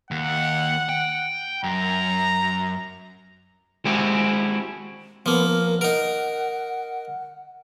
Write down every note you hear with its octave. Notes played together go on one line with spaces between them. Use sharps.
D#2 F#5
G5
F#2 A#5
G#3 C4 E4 F#4 G4
F3 A#3 B3
A#4
D#4 A#4 F#5